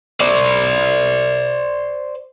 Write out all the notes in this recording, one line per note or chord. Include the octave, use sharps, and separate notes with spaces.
C5 D5